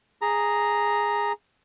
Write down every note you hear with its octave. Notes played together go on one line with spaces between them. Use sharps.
G#4 A#5